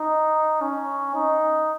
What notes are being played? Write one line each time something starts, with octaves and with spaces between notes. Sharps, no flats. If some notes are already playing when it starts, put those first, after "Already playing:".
Already playing: D#4
C#4
D#4